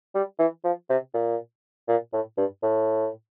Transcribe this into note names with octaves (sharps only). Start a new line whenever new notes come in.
G3
E3
F3
C3
A#2
A#2
A2
G2
A2